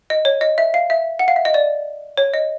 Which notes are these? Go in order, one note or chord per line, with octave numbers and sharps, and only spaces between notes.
D#5
C#5
D#5
E5
F5
E5
F#5
F5
E5
D#5
D5
C#5
D#5